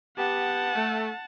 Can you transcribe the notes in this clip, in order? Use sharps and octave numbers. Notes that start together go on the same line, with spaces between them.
B3 G4 F#5 A5
A3